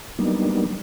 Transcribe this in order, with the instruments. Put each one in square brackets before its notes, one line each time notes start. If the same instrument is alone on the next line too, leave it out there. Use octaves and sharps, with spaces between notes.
[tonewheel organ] F#3 G3 A#3 B3 D4 D#4